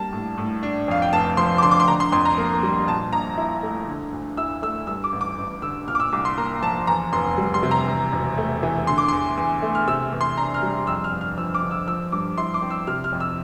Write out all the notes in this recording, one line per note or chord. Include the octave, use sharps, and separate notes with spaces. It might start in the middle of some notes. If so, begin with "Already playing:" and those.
Already playing: G3 A#3 D4 A5
A2
A2
D4
F2 F5
G5
F1 A5
F3 C6
D6
D3 C6
D6
C6
D3 A#5
C6
F2 C6
A#5
A#3
G3
A#2 A5
A#1 A#5
E4
A3
D3
D2
E4 E6
A3 E6
G2 E6
D6
A1
D6
A1
D3 E6
A#2 F6
D6
E6
C2 D6
C6
A#3 A#5
F3 A5
E2 A#5
F1 C6
G3
C6
C3
A#5
E2
E1
A3
E3
D3 C6
D6
E2 C6
E2
A3
F6
C3 E6
E2
C6
D4 A#5
F6
G3
F2 E6
F6
G1
F6
F3 E6
D6
D3
E6
F3 E6
G2 D6
E4 C6
D6
C4
E6
C3 F6
F6
F2
E6